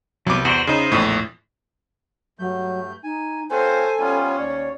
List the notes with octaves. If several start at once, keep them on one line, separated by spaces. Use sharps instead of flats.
C2 F#3 B3 D6
E2 F#4 C5 D5
C#3 D#4 C5 D#5 E5
A#1 E2 A2
G2 F#3 A3 G6
D#4 G#5
C4 F4 A4 C5 C#5 G#5
G3 B3 C#4 F4
D#2 C#5 D5